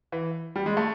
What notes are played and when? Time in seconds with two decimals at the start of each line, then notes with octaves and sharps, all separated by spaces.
0.12 E3
0.56 G3
0.66 G#3
0.77 A3